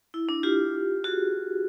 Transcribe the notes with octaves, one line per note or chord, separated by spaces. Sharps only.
E4
D4
F4 G4
F#4 G#4